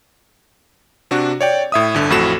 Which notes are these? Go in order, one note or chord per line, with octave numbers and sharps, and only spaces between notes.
C3 D4 F#4
C#5 D5 G5
A2 E5 D#6
G1 D3
A1 F2 A2 F#4 A4 E7